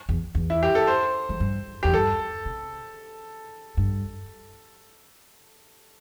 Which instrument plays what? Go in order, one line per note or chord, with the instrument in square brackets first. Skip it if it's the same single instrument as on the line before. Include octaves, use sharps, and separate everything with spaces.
[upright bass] E2
E2
[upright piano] E4
G4
A4
C5
[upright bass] E2
G2
[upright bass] E2 [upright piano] G4
[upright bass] G2 [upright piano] A4
[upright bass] C3
G2